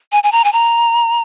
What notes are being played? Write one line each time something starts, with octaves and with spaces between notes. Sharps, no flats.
G#5
G#5
A#5
G#5
A#5